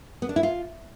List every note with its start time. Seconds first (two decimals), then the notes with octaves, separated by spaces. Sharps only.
0.22 B3
0.29 D4
0.36 E4
0.43 F4